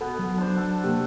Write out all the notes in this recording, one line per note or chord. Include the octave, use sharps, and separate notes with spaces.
B2 B3 A4
F#3
D4 C5
A4 F#5 A5
C3 A3 A#3 G4